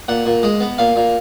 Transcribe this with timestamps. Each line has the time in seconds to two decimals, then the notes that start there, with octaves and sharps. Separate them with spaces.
0.08 A#2 F#5
0.26 A#2
0.43 G#3 D#5
0.60 B3
0.78 A#2 F5
0.96 A#2